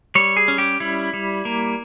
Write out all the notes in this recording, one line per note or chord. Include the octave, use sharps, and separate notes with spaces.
G3 C#5
G#4
C#4
G4
G3 E4
G3
A#3